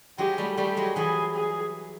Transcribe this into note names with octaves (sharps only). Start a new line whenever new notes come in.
F#3 G#3 G4
G3 A3
G3 A3 G4
F#3 G#3
E3 F#3 G#4
G#4